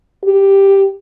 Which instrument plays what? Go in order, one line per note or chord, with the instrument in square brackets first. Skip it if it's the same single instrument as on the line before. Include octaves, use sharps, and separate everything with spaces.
[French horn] G4